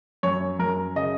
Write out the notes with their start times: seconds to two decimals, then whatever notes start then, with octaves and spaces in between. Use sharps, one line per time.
0.23 F#2 C#5
0.59 F#2 A#4
0.96 C#3 D#5